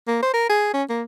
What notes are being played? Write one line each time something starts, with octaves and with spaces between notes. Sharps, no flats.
A#3
C5
A#4
G#4
C#4
A#3